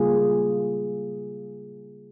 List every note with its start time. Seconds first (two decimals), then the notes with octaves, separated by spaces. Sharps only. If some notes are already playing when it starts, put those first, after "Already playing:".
Already playing: C#3 G3 A#3 F4 G#4